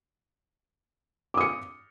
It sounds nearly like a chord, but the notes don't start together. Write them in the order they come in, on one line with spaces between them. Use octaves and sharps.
D6 D#6 C#7